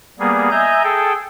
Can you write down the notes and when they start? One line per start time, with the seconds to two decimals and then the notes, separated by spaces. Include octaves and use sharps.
0.20 G3 A#3 B3 G#4
0.51 D#5 E5 G#5 A#5 G6
0.84 G#4 A4 G5